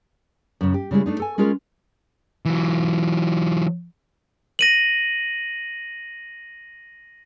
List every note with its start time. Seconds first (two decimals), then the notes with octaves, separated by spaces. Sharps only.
0.61 F#2 C#3
0.74 G4
0.91 C#3 G3 G#3 E4
1.06 A3 D4 D#4
1.20 A4 G#5
1.38 G#3 C#4 F4 G#4 A#4
2.45 E3 F#3
4.59 A#6 D#7 F#7